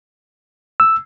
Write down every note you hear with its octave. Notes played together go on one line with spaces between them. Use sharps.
E6